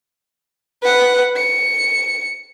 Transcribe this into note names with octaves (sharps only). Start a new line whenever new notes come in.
B4 F#5
C#7